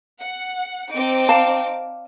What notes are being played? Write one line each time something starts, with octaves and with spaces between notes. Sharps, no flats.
F#5
C4 D#4 D6
D5 F5 A5